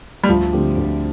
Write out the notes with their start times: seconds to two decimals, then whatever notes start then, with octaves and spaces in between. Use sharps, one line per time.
0.24 G3
0.29 D2 F3
0.53 D3 A3 C4 G4
0.77 D2